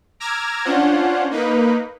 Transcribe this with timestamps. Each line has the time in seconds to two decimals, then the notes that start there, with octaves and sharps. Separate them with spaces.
0.20 A#5 D6 E6 F6 G#6 A#6
0.65 C#4 D4 F4 C5 F#5
1.30 A#3 D#4 B4